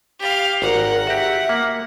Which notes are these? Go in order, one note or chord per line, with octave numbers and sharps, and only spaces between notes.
G4 F5
G#1 A#4 F#5
F#4 G4 E5
A#3